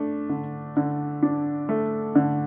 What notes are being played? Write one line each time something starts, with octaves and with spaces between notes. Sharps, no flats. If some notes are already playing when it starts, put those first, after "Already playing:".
Already playing: A3 D4
D3
D3
D4
A3
D3